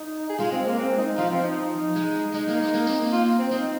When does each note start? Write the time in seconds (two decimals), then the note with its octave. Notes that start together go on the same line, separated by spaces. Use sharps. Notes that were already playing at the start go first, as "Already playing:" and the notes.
Already playing: D#4
0.30 G#4
0.39 G#3 F4
0.52 C4
0.66 A#3
0.78 C4
0.98 D#4
1.18 F3 F4
1.31 C4
1.44 D#4
1.96 G#3
2.34 G#3 D#4
2.48 A#3
2.60 G#3
2.74 A#3
2.87 C4
2.99 A#3
3.12 F4
3.39 C4
3.51 C4 D#4